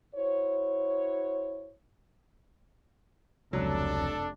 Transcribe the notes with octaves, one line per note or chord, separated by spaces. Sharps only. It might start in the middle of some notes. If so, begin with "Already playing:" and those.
E4 F#4 C5 C#5
F1 C#2 F#3 D4 A4